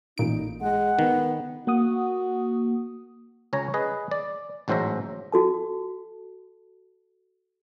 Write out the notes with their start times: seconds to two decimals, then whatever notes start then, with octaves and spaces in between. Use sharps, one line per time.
0.18 A1 A#2 D#4 D7
0.61 G#3 F#5
0.99 D#3 B3
1.67 A#3 F#4 F#5 D#6
3.53 C#2 C#4 C#5 A#5
3.74 G#4 B4 D#5
4.11 D5
4.68 A1 G#2 F#3 C5 E5 A#5
5.32 F#4 A4 A5